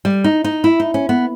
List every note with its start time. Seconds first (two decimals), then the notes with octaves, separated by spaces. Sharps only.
0.05 G3
0.24 D#4
0.44 D#4
0.64 E4
0.80 D#4
0.94 C#4
1.09 B3